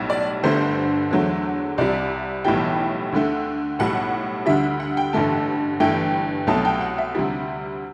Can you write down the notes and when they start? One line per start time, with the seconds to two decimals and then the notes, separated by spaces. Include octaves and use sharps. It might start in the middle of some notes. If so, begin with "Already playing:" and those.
Already playing: B1 A2 G3
0.10 D5
0.43 G1 G2 D3 A3 C5
1.11 E2 D3 F#3 A3
1.78 C2 C3 G3 D5
2.44 B1 A2 E3 G3 G5
3.12 D2 D3 A3
3.79 B1 A2 G3 F#5
4.46 D2 D3 G3 E5
4.80 F#5
4.97 G5
5.13 A1 G2 D3 A3 A5
5.80 G1 G2 E3 A3 G5
6.47 C2 B2 F#3 A3 A5
6.65 G5
6.81 F#5
6.98 E5
7.15 D2 C3 G3